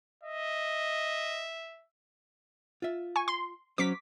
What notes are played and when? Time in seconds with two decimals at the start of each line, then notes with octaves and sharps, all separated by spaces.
0.23 D#5 E5
2.82 F4 E5
3.16 G#5 C#6
3.28 C6
3.78 F#3 C#4 C5 D6 B6